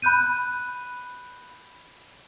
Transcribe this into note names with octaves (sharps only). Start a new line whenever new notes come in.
B5 F#6 G6 D#7